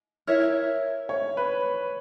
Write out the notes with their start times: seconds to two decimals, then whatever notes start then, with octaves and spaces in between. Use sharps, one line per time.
0.27 E4 A#4 C#5 E5
1.09 C#5
1.37 B4